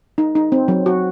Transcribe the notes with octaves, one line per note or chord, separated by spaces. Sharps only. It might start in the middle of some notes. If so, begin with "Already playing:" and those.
D#4
D#4
C4
F#3
F#4